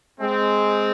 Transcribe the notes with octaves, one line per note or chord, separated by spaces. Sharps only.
G#3 C4